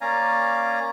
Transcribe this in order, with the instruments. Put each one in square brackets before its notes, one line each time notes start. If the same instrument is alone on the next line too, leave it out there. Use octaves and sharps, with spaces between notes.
[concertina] A#3 C#4 D5 F5 G#5 A#5